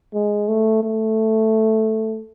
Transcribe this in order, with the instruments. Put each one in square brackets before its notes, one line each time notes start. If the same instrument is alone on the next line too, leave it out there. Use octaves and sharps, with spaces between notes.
[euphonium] G#3
A3
A3